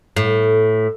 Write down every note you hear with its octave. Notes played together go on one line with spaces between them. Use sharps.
A2